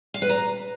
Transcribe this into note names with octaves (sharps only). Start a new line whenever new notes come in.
F5
B4
A#5